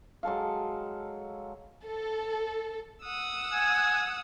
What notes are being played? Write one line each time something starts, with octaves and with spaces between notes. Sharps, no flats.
F#3 G#3 A4 F5
A4
F#5 D#6 E6
G#5